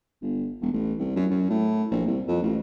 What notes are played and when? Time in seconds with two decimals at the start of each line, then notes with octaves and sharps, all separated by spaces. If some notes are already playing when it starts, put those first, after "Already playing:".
0.22 G1
0.61 E1
0.73 A1
0.98 C2
1.16 F#2
1.31 F#2
1.50 A2
1.91 A#1
2.07 C2
2.28 F2
2.42 A1